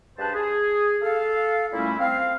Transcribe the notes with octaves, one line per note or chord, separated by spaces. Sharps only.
G2 D4 G#4 B4 C5 A5
G#4
A4 F5
A#2 G3 A3 C#4 E4
C4 F5